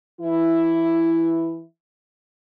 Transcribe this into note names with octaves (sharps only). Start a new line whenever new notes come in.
E3 E4